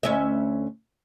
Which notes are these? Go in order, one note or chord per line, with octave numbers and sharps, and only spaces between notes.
D2 C#4 E5